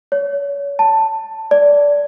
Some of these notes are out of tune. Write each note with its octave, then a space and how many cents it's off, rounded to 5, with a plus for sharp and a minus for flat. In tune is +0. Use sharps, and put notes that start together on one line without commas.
C#5 +35
A5 +10
D5 -15